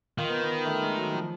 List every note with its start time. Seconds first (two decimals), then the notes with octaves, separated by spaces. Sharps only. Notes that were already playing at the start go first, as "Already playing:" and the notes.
0.18 D#3 F4
0.29 B3
0.41 B3
0.65 A3
0.82 G#3
0.97 F#3
1.13 F3